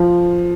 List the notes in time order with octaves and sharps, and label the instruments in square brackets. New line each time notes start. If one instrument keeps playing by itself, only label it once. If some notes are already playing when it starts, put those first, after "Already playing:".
Already playing: [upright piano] F3